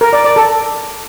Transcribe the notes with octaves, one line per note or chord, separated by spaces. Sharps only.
A#4
D5
D5
A4